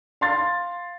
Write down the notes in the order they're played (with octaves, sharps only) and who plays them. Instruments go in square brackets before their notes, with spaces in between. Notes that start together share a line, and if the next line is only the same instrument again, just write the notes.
[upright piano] F5 C6 A6